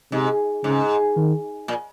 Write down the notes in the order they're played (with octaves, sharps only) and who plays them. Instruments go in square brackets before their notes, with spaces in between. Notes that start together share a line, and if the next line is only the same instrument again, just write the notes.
[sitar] G#2 [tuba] C3
[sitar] G#2 [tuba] C#3
[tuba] D#3
[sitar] A#2